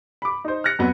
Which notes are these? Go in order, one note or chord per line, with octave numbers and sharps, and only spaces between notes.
B5 D6
D#4 C5
F6 F#6 A#6 C#7
F2 F#3 B3